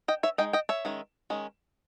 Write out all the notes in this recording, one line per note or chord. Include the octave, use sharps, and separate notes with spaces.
D#5 G5
C#5 E5
G#3 D#4 D#5 G5
D#5 G5
C#5 E5
D#3 G#3 C#4
D#3 G#3 C#4